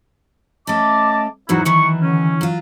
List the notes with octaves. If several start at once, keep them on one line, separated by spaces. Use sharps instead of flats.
A3 C#4 D#5 A5 D6
E2 G#2 F#3 D#4 E4 F#4
D#3 E3 F#3 C#6
D3 C#4
F#3 F4